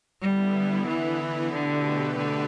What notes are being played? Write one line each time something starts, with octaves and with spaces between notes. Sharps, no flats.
D3 G3 B3 E4
E3
B2 D3 A3 G4 B4
D3